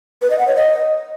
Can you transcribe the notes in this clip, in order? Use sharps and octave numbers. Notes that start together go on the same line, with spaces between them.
B4
D#5
F#5
C#5
D#5